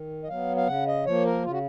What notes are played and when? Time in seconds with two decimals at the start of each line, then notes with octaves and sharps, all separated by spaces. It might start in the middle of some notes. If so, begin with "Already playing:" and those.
Already playing: D#3
0.23 D#5
0.28 F#3 B3 F5
0.57 F5
0.67 C#3 F#5
0.87 D#5
1.06 F3 A#3 C#5
1.26 A#4
1.45 C#3 F4
1.52 F#4